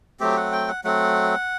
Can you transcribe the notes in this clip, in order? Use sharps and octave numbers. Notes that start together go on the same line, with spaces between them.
F#3 A3 C4 G4
F#5
G5
F#5
F#3 A3 C4 F#5